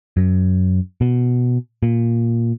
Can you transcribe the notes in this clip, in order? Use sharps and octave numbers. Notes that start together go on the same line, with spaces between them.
F#2
B2
A#2